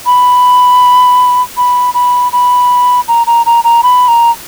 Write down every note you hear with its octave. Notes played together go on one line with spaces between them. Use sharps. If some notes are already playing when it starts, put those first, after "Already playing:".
B5
B5
B5
B5
A#5
A#5
A#5
A#5
B5
A#5